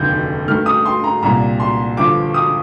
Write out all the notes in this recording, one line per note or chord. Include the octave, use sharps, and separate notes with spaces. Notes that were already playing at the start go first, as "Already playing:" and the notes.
Already playing: F1 D#2 D3 G6
G2 D#3 A3 F6
D#6
C6
A#5
C2 A#2 G3 A#5
C6
G1 G2 D3 F3 D6
D#6